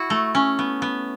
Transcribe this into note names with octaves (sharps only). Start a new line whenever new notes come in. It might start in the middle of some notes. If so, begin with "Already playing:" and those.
Already playing: E4 F#4
A3
C#4
B3
B3